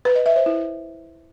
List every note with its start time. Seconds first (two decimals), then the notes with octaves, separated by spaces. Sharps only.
0.05 B4
0.15 D#5
0.26 E5
0.36 C5
0.46 E4